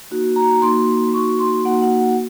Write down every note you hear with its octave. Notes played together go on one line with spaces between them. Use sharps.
A#3 D#4 F#4
A#5
A#3 D#4 F#4 C6
A#3 D#4 F#4 C#6
C6
A#3 D#4 F#4 F#5
F#5
F#5